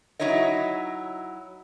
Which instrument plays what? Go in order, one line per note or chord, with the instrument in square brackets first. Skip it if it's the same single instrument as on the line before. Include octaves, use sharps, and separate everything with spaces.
[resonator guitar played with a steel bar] F#3 D#4 E4 C#5 D#5